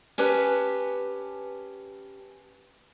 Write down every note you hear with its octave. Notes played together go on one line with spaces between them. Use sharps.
C#4 G4 B4 A5